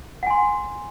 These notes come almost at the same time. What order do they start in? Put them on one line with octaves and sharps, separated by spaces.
F#5 G#5 C6